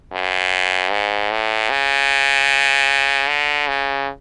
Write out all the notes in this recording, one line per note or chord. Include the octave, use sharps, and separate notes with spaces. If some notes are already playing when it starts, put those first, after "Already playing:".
F#2
G#2
A2
C#3
D3
C#3